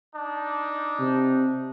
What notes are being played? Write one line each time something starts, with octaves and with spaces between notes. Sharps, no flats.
D4 D#4
C3